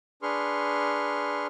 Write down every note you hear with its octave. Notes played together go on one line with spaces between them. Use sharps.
D4 G#4 B4 C6 C#6 F6